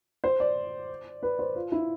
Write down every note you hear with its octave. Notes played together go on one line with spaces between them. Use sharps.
C5
D5
B4
C5
F4
E4